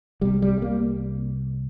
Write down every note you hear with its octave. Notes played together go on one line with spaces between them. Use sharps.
C2 C3 G3
G3
A#3